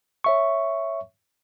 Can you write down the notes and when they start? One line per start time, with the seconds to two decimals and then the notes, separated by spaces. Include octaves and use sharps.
0.24 C#5 E5 C#6